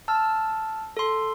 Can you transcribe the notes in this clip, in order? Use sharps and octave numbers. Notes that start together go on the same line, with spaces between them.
A5 E6 F6
A4 C6